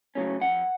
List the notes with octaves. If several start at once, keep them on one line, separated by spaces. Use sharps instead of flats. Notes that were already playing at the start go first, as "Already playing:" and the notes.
C#3 F#3 A3 C#4
F2 F#5